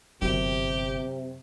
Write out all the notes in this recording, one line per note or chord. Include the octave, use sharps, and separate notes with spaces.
G1 F#2 C3 G4